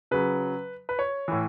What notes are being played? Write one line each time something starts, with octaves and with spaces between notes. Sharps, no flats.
C#3 F#3 B4
B4
C#5
A2 E3